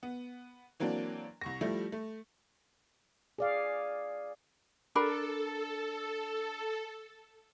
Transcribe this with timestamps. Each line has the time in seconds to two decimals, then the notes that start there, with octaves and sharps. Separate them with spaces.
0.03 B3
0.80 E3 F#3 A#3 C4 D4
1.41 C2 C#6 A#6
1.61 F3 G3 A3 E4
1.92 A3
3.38 G#4 D5 F5
4.95 D4 A4 A#4 B5